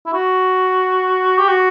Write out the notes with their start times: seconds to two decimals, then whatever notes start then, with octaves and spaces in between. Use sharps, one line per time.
0.06 E4
0.13 F#4
1.38 G4
1.48 F#4